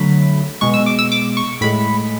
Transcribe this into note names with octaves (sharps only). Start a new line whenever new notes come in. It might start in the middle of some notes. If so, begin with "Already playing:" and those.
Already playing: D3 F#3 A3 B5
B2 G#3 C#6
E6
D6
E6
D6
C#6
A2 G#3 B5